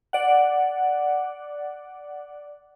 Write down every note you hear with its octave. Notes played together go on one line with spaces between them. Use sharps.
D5 F#5